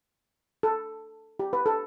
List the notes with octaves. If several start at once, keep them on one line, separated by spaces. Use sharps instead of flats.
A4
G4
B4
A4